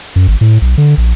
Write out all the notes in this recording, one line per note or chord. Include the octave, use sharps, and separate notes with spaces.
F#2
G#1
A2
B1
D3
A#1